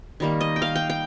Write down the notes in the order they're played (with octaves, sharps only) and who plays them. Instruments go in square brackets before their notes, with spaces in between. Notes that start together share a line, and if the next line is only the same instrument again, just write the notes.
[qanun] D#3 G3 A#3
D#5
G5
F5
G5
G5